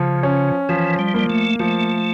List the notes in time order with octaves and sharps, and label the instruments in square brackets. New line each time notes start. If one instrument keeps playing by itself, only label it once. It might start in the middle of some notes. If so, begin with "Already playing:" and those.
Already playing: [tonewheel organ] C#3 [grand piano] F3
[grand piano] C#4
[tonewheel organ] E3 [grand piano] F3
[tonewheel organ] G3
[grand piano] A#3
[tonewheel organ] A3
[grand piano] F3 [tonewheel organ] A3